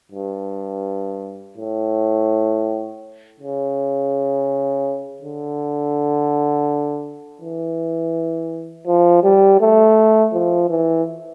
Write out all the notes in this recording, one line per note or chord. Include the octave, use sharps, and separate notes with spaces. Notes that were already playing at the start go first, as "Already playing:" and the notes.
G2
A2
C#3
D3
E3
F3
G3
A3
F3
E3